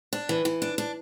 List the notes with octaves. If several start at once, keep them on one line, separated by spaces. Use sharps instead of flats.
D4
E3
E3
D4
D4